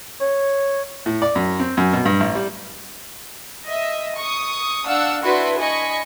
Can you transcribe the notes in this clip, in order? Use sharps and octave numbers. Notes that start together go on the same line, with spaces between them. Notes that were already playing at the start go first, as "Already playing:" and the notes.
C#5
A2
D5
F#2
C4
F#2
B2
G2
A1
G3
D#5 E5
C#6 D#6
D4 F5 F#5 E6
D4 E4 F#4 B4 B5 C6
D#5 G#5 B5 C#6